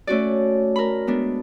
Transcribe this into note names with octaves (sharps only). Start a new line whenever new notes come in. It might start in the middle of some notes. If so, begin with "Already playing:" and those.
A3 C#4 F#4 D5
A#4 B5
G#3 B3 D4